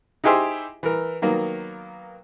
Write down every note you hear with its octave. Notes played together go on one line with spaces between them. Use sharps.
D#4 E4 G4 G#4 C5 E5
E3 A#4
D#3 F#3 A#3 B3